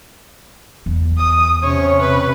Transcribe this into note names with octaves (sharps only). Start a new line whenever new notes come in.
E2
D#6
C3 C#4 C#5
B4